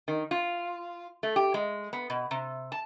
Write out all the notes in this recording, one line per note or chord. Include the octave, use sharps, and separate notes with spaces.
D#3
F4
A3
G4
G#3
B3
B2
C3
A5